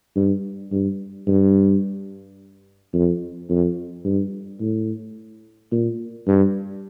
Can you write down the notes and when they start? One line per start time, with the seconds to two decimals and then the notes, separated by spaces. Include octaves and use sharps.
0.16 G2
0.72 G2
1.27 G2
2.93 F2
3.49 F2
4.05 G2
4.60 A2
5.72 A#2
6.27 G2